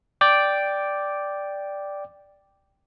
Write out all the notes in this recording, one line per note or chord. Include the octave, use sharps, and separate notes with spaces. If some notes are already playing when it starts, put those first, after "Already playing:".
D5 G5 D6